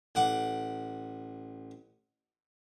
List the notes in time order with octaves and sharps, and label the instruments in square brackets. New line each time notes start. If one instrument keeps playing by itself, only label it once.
[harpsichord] A1 F#5 D6